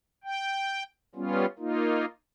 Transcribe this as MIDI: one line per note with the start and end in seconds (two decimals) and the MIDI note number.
0.24 0.83 79
1.15 1.46 55
1.15 1.46 59
1.15 1.46 61
1.15 1.46 65
1.59 2.05 58
1.59 2.05 63
1.59 2.05 65